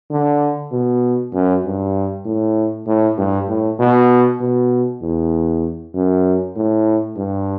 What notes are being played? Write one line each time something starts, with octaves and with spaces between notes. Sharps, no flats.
D3
B2
F#2
G2
A2
A2
G2
A2
B2
B2
E2
F#2
A2
G2